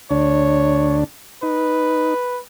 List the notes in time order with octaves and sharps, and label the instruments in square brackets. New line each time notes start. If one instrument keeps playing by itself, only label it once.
[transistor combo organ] D2 D4 [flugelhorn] C#5
[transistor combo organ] D#4 [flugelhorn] B4